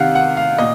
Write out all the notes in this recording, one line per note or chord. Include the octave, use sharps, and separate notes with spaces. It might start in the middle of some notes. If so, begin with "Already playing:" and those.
Already playing: C3 D#3 F5 F#5
F#5
F5
A#2 D#5